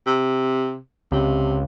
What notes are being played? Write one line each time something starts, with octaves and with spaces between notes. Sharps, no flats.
C3
C#2 C3